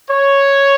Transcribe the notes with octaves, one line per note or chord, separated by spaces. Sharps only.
C#5